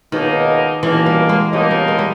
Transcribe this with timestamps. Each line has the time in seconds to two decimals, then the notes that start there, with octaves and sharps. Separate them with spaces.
0.12 C#2 B2 D#3 A#3 D#4
0.83 C#2 B2 E3 A#3 D#4
1.06 G3
1.29 G#3
1.53 C#2 B2 G3 A#3 D#4
1.71 G3
1.88 G#3
1.99 G3